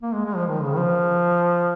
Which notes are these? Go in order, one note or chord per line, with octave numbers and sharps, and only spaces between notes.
A#3
G#3
G#3
F3
D#3
C#3
D#3
F3